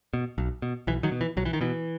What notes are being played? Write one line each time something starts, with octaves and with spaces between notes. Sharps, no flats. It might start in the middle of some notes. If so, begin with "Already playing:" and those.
B2
B1
B2
B1 E3
D#3 F#3
B2
E3
B1 F#3
E3
D#3
B2 E3